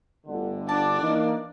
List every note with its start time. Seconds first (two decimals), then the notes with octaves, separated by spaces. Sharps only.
0.26 G1 D2 D3
0.69 D4 D5 A5
1.01 E3 A#3 D#4